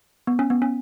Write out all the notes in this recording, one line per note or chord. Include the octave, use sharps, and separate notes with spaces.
B3
C#4
B3
C#4